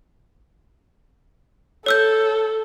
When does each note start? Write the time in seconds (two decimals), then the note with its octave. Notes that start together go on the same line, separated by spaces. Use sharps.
1.86 A4 C#5 E6 G6